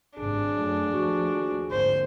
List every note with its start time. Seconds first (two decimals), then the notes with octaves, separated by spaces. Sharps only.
0.18 G#1 C3 D4 G#4
0.57 F#2 F#3 A3
0.93 D#2 F3 A3 F#4
1.71 G#1 D3 A#3 C5